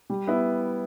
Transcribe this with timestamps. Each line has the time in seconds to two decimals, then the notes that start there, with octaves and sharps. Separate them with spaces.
0.10 G3
0.27 B3 E4